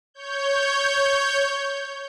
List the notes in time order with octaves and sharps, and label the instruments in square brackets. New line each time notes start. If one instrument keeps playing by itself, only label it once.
[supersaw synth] C#5 G6